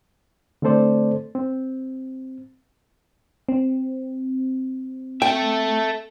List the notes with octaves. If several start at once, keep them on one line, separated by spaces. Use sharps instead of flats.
D3 A3 C4 A4 C5 D5
C4
C4
A4 E5 G5